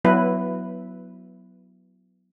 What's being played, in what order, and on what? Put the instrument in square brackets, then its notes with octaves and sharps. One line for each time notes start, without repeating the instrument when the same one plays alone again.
[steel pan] F#3 B3 E4 B4